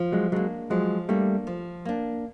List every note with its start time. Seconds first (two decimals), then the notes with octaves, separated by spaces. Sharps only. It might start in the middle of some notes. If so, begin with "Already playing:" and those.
Already playing: F3
0.12 F#3 G#3
0.32 F#3 G#3 A#3 D4
0.70 F3 F#3 G#3
1.09 G3 A3 A#3 D4
1.47 F3
1.85 A#3 D4